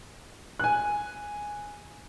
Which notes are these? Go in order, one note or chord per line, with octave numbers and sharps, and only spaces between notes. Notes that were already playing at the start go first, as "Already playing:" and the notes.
G#5 F#6